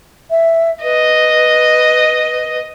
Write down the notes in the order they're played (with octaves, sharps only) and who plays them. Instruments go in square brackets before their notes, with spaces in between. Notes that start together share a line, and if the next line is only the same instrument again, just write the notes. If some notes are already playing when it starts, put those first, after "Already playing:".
[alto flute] E5
[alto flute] B4 [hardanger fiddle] D#5